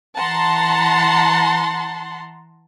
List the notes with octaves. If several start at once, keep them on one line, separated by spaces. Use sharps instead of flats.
E3 F#5 A5 A#5 C6